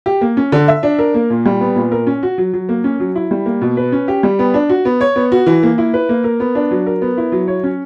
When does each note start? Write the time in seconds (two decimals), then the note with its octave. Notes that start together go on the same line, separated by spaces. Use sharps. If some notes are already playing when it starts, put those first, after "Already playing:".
0.06 G4
0.21 A#3
0.37 C#4
0.52 D3
0.68 E5
0.83 D4
0.99 A#4
1.14 A#3
1.30 A#2
1.46 G3
1.61 B3
1.76 A#2
1.92 A#4
2.07 C#4
2.23 F#4
2.38 F#3
2.53 F#3
2.69 A#3
2.84 C#4
3.00 F#3
3.15 E4
3.31 G3
3.46 A#3
3.61 B2
3.77 B4
3.92 C#4
4.08 G4
4.23 G3
4.39 B3
4.54 D4
4.69 F#4
4.85 B3
5.01 C#5
5.16 B3
5.32 F#4
5.46 E3
5.63 A#3
5.78 E4
5.94 B4
6.09 A#3
6.24 A#4
6.40 B3
6.55 D4
6.71 F#3
6.86 A#4
7.02 B3
7.17 E4
7.32 F#3
7.48 C#5
7.64 C#4